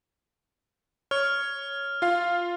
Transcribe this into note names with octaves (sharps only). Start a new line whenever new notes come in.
C#5 F6
F4 F5